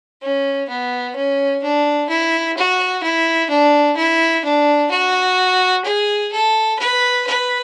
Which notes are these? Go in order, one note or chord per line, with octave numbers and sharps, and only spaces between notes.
C#4
B3
C#4
D4
E4
F#4
E4
D4
E4
D4
F#4
G#4
A4
B4
B4